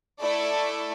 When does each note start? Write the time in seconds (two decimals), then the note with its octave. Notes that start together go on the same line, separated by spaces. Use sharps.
0.21 A3 E4 A4 D5